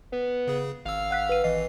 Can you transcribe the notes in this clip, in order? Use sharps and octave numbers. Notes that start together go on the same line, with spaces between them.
B3
C#3 G#4
G#1 F5 E6
F#5 F#6 B6
B4 D#7
G#1 E3 D#5 C7